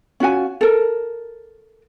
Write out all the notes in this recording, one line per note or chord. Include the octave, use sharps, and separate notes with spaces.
C#4 F4 F#4 G#5
A4 A#4